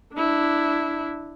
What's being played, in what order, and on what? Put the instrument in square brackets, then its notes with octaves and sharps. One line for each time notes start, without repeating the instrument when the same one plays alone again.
[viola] D4 E4